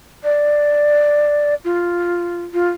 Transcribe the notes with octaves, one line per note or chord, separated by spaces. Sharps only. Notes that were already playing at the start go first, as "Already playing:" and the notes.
D5
F4
F4